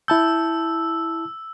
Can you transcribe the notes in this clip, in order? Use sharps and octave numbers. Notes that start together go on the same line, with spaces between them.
E4 A5 E6 G6